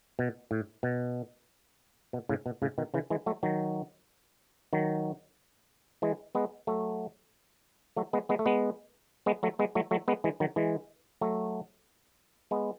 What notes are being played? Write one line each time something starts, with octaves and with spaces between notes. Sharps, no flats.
B2
A2
B2
B2
A2 C#3
B2
A2 C#3
B2 D#3
C#3 E3
E3 G#3
F#3 A3
D#3 F#3
D#3 F#3
E3 G#3
G#3 B3
F#3 A3
F#3 A3
G#3 B3
G#3 B3
A3
G#3 B3
G#3 B3
F#3 A3
G#3 B3
F#3 A3
F#3 A3
G#3 B3
E3 G#3
D#3 F#3
E3 G#3
F#3 A3
G#3 B3